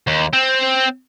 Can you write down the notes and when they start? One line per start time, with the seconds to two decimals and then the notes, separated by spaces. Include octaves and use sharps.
0.07 D#2
0.33 C4